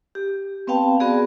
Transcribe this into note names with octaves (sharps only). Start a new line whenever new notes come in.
G4
B3 C4 B4 F5 G5 A5
B3 F#4 G#4 D5